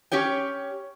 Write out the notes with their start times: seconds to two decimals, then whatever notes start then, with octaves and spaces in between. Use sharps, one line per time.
0.12 C#4 G4 C#5 G5